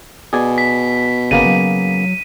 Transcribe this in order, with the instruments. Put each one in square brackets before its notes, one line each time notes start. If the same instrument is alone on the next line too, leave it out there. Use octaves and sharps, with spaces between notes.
[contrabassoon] B2 [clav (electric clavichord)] G#4 D5 G#5
[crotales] B6
[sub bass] G1 [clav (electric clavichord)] C#3 A#3 B3 [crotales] D#7
[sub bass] F#3